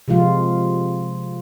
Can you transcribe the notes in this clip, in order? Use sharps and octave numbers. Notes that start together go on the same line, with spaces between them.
C3 F3 G#3 F4